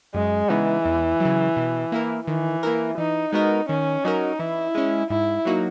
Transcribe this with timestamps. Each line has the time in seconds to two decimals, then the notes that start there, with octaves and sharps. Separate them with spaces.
0.14 F#2 G#3
0.50 C#3 E3 G#3 B3 D#4
0.85 E2
1.20 F#3
1.25 C#3
1.57 B2
1.92 A#3 E4 A#4
2.27 D#3 E3
2.63 A#3 E4 A#4
2.98 E3 D#4
3.32 G#3 B3 D#4 F#4 A#4
3.69 D#3 C#4
4.04 F#3 C#4 D#4 F#4 A#4
4.39 E3 E4
4.75 G#3 C#4
5.10 G#2 E4
5.45 F#3 A#3 D#4 F#4